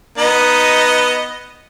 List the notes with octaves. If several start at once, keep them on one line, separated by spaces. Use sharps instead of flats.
B3 D#4 D#5